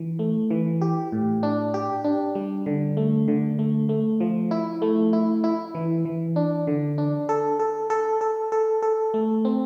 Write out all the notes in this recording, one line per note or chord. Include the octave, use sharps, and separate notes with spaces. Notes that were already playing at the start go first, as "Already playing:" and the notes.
Already playing: E3
A3
E3
G4
A2
D4
G4
D4
G3
D3
A3
D3
A3
A3
F3
E4
A3
E4
E4
E3
E3
D4
D3
D4
A4
A4
A4
A4
A4
A4
A3
C4